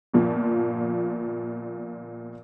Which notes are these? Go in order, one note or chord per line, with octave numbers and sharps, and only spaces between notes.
G1 A#2 F3